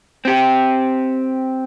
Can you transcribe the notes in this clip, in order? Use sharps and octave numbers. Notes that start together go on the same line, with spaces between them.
C4 G4